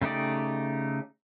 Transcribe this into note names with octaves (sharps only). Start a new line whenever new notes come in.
C#3 A3 D#4 G4 D5